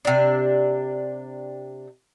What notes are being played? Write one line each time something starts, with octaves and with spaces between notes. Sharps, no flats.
C3 D4